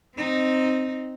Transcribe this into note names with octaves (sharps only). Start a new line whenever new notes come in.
C4 D#4